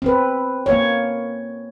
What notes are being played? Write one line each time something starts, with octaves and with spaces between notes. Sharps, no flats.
C4 B4
A#3 C#5